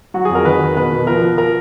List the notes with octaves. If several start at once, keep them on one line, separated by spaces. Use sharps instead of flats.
F#3 F#4
G#4
F2
A#4
D#3 B4
D#3
B2 B4
B2
F3 A#4
F3
A#4